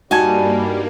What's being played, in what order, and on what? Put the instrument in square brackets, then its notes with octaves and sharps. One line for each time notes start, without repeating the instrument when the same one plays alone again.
[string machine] G2 A#3 [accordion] G3 [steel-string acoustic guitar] D#4 G#5 A5 [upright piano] F#4 G#6